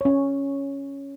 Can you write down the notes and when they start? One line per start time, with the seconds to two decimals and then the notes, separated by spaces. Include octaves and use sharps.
0.01 C#4 C#5